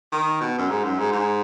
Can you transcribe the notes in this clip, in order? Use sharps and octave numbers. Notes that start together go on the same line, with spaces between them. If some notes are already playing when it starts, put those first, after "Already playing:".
D#3
B2
F#2
G#2
F#2
G#2
G#2